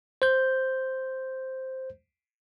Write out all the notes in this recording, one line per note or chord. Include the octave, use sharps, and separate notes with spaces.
C5 G6